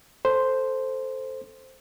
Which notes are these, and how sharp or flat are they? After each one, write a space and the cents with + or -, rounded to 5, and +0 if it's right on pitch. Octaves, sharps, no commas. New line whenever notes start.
A4 +0 C5 +0